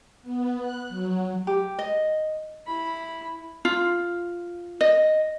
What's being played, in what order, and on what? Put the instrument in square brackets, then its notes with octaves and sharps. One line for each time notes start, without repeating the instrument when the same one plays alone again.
[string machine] B3
F#6
F#3
[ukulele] G4
D#5
[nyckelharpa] E4 B5
[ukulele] F4
D#5